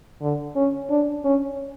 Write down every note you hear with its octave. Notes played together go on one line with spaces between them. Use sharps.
D3
C#4
D4
C#4